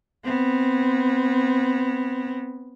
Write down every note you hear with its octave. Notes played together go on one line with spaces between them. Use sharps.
B3 C4